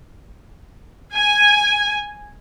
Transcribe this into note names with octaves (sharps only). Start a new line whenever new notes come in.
G#5